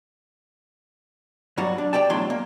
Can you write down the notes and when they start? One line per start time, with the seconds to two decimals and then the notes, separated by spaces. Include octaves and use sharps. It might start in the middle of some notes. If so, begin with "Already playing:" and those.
1.57 G2 F#3 G3 F#4
1.78 D4
1.93 G4 D5 G5 A5
2.10 B1 E2 A2 F#3 D4 C6
2.30 A#3